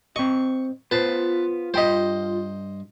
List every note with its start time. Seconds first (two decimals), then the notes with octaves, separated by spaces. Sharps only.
0.16 C4 D#5 C#6
0.91 B3 F4 B4 C5 A5
1.74 G2 C5 D#5 G5 B5